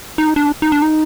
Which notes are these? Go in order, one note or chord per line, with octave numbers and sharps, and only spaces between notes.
D#4
D4
D#4
D4
D#4